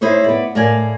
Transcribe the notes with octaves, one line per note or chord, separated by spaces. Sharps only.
D#4 E4 G#4 C5 C#5
B3 D5
A2 A#4 D5 F5 G#5